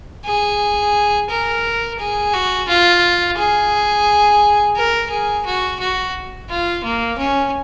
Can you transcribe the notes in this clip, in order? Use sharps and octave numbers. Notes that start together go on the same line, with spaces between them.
G#4
A#4
G#4
F#4
F4
G#4
A#4
G#4
F#4
F#4
F4
A#3
C#4